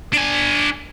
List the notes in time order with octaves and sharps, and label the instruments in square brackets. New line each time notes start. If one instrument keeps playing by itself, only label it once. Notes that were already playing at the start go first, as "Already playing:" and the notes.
[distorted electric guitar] D4 G#5